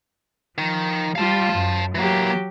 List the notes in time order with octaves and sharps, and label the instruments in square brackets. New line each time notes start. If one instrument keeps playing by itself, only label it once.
[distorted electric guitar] D#3 [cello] F3
[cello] G3 F4 [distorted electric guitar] F5 A5
[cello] F#2
[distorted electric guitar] E3 A#3 [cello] F#3 G4